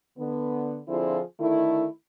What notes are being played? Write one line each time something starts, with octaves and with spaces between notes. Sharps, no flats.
D3 B3
D3 F3 C4 E4 F4 G#4
D3 D#3 A3 E4